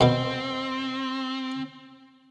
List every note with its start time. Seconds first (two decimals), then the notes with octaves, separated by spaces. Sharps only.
0.01 B2 B3 C4